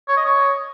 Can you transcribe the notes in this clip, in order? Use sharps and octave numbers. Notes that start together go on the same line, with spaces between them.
C#5
D#5
C#5